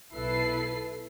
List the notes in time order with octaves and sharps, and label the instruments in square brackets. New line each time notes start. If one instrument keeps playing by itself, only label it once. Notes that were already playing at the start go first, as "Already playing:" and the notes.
[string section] B1 E4 A4 B4 C7